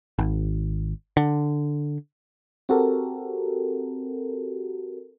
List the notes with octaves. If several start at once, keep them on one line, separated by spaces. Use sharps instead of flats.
G#1
D3
C4 F#4 G4 A4 A#4